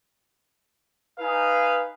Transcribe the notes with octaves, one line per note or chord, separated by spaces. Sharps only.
D#4 B4 F5 G#5